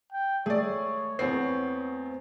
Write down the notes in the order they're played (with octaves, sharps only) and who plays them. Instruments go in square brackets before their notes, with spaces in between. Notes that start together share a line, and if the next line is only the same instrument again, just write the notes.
[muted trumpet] G5
[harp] A3 [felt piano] G#4 D5 [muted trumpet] C#5
[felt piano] E2 B3 C7 [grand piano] C4